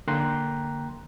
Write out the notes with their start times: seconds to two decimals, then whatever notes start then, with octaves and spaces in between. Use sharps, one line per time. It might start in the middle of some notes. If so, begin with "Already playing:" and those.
0.08 D3 A#3 G5 A#5 C6 F#6